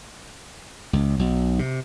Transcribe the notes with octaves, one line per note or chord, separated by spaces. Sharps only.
C#2
B1
C3